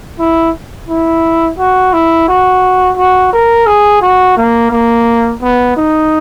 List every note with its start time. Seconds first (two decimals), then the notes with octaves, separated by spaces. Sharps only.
0.19 E4
0.89 E4
1.59 F#4
1.93 E4
2.28 F#4
2.97 F#4
3.33 A#4
3.67 G#4
4.02 F#4
4.37 A#3
4.71 A#3
5.42 B3
5.77 D#4